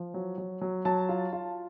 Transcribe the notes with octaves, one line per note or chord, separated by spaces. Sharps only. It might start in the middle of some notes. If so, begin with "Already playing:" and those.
Already playing: F3
F#3
F#3
F#3
F#3 A5
F4
F4